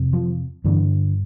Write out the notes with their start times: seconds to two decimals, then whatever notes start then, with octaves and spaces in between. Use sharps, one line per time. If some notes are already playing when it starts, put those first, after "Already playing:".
Already playing: F2 C3
0.13 F3
0.64 G2 D3 E3